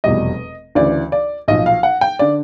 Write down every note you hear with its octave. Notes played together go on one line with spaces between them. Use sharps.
F1 E2 B2 G3 D#5
D2 C#3 E3 D5
D5
B1 A#2 F3 D#5
F5
F#5
G5
D3 D5